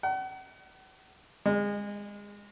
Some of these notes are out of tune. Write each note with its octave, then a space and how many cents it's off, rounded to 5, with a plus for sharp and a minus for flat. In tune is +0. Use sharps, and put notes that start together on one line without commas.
F#5 +40
G#3 -25